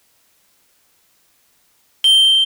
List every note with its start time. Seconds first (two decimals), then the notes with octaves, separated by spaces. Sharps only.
2.04 G7